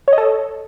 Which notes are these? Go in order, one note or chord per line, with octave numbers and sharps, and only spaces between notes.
C#5
D#5
A4